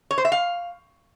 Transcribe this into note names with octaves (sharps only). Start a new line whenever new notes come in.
C#5
C5
E5
F5